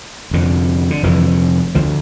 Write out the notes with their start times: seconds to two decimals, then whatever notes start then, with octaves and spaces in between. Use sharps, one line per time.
0.31 F1 F2 D3
0.90 D3
1.03 F1 F2 D3 E3
1.75 D2 D3 F3